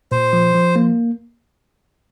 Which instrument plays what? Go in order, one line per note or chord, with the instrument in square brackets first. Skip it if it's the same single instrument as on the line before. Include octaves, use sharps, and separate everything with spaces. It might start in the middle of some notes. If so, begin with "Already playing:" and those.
[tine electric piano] A#2 [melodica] C5
[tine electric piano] F3
F3
A#3